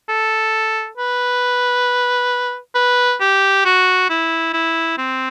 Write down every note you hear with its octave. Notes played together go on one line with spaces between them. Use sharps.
A4
B4
B4
G4
F#4
E4
E4
C4